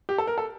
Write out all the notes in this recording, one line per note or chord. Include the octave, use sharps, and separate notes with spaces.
G4
A4
A#4
A4